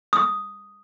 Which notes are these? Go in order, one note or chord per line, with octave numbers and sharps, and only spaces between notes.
D#6